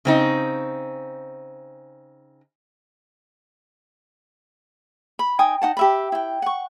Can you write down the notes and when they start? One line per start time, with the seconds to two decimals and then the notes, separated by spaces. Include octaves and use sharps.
0.05 C#3 C4 D#4
5.19 B5
5.39 D#4 G5 G#5 D#6
5.62 D#4 F#5 A5
5.77 G4 E5 B5
6.12 E4 G5
6.42 F#5 C#6